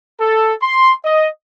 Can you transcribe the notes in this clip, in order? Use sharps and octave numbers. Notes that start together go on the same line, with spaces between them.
A4
C6
D#5